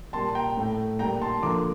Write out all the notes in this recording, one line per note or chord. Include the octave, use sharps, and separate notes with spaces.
A#2 G3 A#3 A5 C6
G5 A#5
A2 A3
A#2 G3 A#3 G5 A#5
A5 C6
D3 F3 A#3 A#5 D6